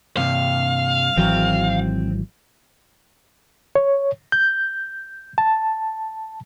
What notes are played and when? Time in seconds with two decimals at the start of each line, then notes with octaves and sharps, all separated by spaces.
0.17 G2 C3 F5
1.17 G#1 E3 F#3 C4
3.75 C#5
4.32 G6
5.38 A5